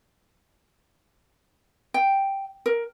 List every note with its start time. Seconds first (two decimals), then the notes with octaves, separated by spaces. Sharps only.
1.94 G5
2.66 A#4